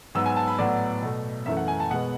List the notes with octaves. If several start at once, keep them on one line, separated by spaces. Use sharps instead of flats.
G#2 F#3 B3 E6
G#5
A5
B5
A2 F#3 B3 D5
B2 A3
F#2 E3 A3 E5
F#5
G#5
A5
B2 G#3 B3 F#5